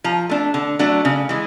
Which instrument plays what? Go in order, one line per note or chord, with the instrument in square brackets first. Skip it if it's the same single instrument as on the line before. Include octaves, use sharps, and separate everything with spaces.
[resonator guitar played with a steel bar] F3 A#5
A3 D4
D3
F#3 A3 D4
C#3
E3 G#3